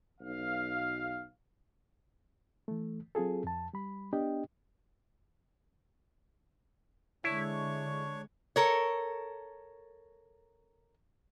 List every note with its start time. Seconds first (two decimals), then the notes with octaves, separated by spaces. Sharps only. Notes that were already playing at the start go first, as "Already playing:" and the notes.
0.21 B1 F5
2.68 E3 A3
3.15 F#3 C4 F4 G#4 A4
3.44 F2 A5
3.74 G3 B5
4.12 B3 D4 G4 D#5 G5
7.24 D3 G#3 D4 E4 C#5 C#6
8.56 A4 A#4 C#5